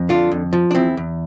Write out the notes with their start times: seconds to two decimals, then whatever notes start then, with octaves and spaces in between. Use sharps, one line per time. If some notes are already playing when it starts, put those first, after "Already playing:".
Already playing: F2
0.09 D3 D4 F4
0.32 F2
0.53 F3
0.71 D4
0.75 E2 C4 E4
0.97 E2